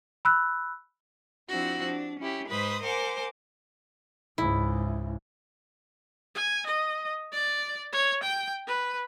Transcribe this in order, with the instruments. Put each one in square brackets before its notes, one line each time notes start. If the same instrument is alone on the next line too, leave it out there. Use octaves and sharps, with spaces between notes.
[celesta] B5 E6 F#6
[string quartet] F3 C4 D4 E4 F#4
D4
C#4 E4 G4
G#2 B4 C5 B5 D#6
A#4 C5 F#5 G#5 D6
[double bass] C#2 G#2 [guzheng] E4
[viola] G#5
D#5
D5
C#5
G5
B4